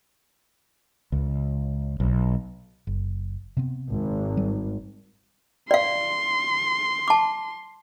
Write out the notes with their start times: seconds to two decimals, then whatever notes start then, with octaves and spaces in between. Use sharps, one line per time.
1.12 C#2
2.00 B1
2.87 F#1
3.57 C3 B3 C4
3.91 G#1
4.37 G3
5.71 D5 F5 C6
7.08 A5 D6